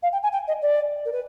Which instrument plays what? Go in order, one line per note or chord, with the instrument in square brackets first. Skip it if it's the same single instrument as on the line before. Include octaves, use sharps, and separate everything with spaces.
[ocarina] F5
G5
G#5
G5
D#5
D5
A#4
B4